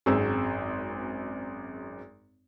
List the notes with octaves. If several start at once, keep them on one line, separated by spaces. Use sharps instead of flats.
G#1 F#2 C4 G#4 C5 E6